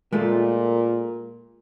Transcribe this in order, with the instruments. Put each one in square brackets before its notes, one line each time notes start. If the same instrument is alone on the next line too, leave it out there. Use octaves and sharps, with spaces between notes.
[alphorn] A#2 [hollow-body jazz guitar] G#3 A3 F4